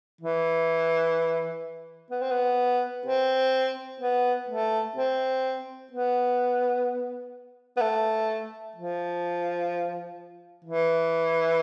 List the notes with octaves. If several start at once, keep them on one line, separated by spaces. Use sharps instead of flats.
E3
B3
C4
B3
C4
B3
A3
C4
B3
B3
A3
F3
E3